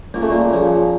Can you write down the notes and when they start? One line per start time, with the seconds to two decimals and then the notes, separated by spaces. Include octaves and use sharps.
0.14 C#2 A#3
0.22 A3
0.30 A#2 A#3
0.52 C#3 F3